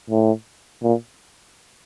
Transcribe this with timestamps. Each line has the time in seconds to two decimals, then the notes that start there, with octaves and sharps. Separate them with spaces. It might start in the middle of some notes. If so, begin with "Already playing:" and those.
0.10 A2
0.83 A#2